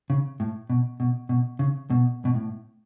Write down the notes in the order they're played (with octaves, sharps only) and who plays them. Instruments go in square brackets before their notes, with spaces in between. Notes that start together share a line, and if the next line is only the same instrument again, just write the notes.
[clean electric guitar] C#3
A2
B2
B2
B2
C#3
B2
B2
A2